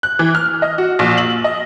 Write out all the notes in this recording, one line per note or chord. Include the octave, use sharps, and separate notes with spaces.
F#6
E3
F6
D#5
F#4
A#1
F#7
D#5